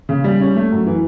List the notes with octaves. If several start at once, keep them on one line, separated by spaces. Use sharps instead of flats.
C#3
G3
C#4
A3
F#2
E3